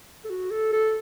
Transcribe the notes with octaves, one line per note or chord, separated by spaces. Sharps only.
A4
F#4
A4
A4